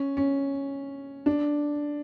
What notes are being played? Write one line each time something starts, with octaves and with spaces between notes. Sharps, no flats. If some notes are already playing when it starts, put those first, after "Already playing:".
Already playing: C#4
C#4
D4